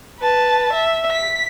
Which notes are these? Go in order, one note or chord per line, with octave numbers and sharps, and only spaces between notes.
B4 A5
E5
B6